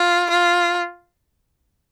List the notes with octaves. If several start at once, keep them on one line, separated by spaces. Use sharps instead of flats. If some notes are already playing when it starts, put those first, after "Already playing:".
Already playing: F4
F4